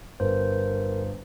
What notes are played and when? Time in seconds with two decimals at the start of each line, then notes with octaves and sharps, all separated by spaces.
0.20 G1 A#4 C5